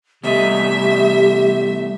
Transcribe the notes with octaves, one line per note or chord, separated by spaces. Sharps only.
E2 C3 G3 A3 D#5 E5